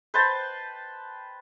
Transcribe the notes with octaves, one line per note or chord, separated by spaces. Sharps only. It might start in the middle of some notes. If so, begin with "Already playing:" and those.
B4 C5 G5 A5